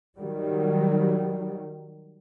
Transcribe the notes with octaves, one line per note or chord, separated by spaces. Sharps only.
D#3 F#3 G3